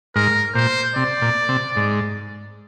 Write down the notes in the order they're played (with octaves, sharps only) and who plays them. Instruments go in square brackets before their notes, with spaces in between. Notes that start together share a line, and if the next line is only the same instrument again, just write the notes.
[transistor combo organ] G#2 [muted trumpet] A#4
[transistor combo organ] A#2 [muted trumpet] C5
[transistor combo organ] C3 [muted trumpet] D5
[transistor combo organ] A#2
C3
G#2